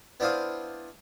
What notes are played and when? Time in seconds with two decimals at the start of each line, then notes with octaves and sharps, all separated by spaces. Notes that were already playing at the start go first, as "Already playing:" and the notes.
0.20 B3 D4 E4 C5 F5 D#6